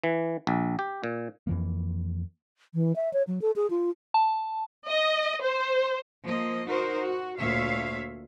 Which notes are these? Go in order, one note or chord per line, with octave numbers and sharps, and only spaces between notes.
E3
A#1
G4
A#2
F2 E3 A#3
E3
E5
C#5
F#3
A4
G#4
F4
A5
D#5
C5
F3 A#3 D#5
D#4 F#4 A#4 C5
F#4
D2 A#2 C#5 E5 F5